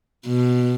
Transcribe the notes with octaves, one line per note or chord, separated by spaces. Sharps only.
B2